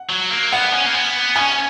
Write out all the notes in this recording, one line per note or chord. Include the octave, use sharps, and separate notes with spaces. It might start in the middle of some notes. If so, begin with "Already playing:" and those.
Already playing: F#5
F#3
A#3
B3 F#5
C#4
A#3
B3
C#4 G#5